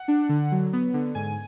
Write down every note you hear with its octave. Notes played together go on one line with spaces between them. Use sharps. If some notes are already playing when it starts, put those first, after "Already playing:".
Already playing: F#5
D4
D3
F#3
B3
D3
G#2 G#5